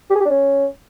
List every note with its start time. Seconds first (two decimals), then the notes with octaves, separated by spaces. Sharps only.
0.10 G4
0.15 G#4
0.20 G4
0.25 D4
0.30 C#4